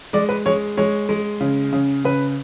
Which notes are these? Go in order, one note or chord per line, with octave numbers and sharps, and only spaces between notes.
G#3 D5
B4
G#3 C#5
G#3 C#5
G#3
C#3
C#3
C#3 B4